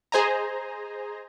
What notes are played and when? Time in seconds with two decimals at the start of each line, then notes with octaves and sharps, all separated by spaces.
0.12 G#4 C5 D#5 G#5 A#5